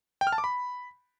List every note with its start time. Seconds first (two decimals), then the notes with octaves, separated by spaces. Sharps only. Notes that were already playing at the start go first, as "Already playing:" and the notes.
0.21 G5
0.27 F6
0.32 A5
0.38 D6
0.44 B5